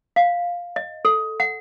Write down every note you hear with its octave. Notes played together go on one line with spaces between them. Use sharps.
F5
D#5
A4
F#5